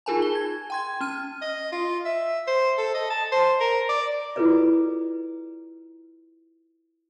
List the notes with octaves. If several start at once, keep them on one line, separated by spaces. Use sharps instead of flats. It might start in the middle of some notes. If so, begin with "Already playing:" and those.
D#4 F4 G#4 A#4 G#5 A5
G#5 G7
G#6
G5 C6 G#6
C#4 F6 D#7
D#5
F4
E5
C5
A4
D#5
A5
C5
A#4
D5
E4 F4 G#4 A4 B4 D5